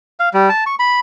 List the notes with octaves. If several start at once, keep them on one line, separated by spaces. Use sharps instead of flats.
F5
G3
A5
C#6
B5